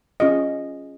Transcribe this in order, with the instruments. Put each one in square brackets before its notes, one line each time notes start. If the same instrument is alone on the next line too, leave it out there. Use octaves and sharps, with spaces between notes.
[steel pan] C#4 F4 G#4 D#5